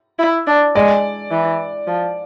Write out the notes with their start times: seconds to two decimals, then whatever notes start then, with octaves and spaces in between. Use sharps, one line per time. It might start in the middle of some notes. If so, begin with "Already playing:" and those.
0.19 E4
0.47 D4
0.75 G#3 D5
1.31 E3
1.87 F3